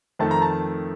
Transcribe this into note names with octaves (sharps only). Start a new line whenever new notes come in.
F2 D#3 A3 A5
A#5
A5